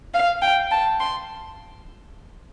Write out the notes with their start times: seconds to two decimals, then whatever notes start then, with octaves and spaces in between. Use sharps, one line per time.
0.14 F5
0.42 G5
0.71 A5
1.00 C6